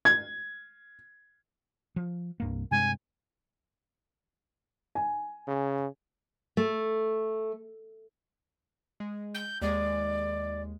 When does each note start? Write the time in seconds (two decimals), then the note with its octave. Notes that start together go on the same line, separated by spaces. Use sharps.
0.05 G#6
1.96 F3
2.40 C2 G2 A#3
2.71 G2 C3 G#3 G#5
4.95 G#5
5.47 C#3
6.57 A3
9.00 G#3
9.34 G6
9.62 D#2 G#3 D5